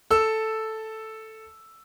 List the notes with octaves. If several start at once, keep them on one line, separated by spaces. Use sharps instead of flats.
A4 E6